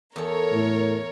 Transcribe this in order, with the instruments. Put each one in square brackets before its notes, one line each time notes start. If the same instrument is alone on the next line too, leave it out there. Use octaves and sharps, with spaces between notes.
[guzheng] E2 A4 [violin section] A#4 C#5
[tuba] A2